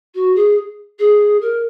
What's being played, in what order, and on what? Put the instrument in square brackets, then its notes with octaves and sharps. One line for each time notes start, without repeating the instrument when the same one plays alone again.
[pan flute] F#4
G#4
G#4
A#4